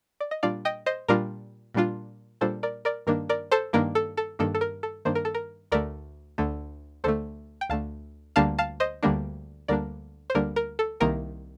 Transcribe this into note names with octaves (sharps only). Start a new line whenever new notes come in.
D5
D#5
A#2 G3 D4 F4 D5 F5
D#5 G5
C5 D#5
A#2 G3 D4 F4 A#4 D5
A#2 G3 D4 F4
A#2 G3 D4 F4 A4 C5
A#4 D5
A#4 D5
G2 D#3 A#3 D4 A#4
A#4 D5
A4 C5
G2 D#3 A#3 D4 A#4
A4
A4
G2 D#3 A#3 D4 A4
A4
A#4
A4
G2 D#3 A#3 D4 C5
A#4
A4
A#4
D2 D3 A3 A#4 D5
D2 D3 A3
D2 D3 A3 A4 C5
G5
D2 D3 A3 F5 A5
D2 D3 G3 A#3 D4 F5 A5
F5 A5
C5 D#5
D2 D3 G3 A#3 D4
D2 D3 G3 A#3 D4 A#4 D5
C5
D2 D3 G3 A#3 D4 A#4
A#4
A4
C2 C3 D#3 A#3 A#4